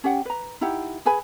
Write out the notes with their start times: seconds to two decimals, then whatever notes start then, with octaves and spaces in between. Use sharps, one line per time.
0.04 C#4 G4 F#5 G5
0.25 B4 A#5
0.61 D#4 E4 G4 F#5
1.05 G#4 B4 G#5 B5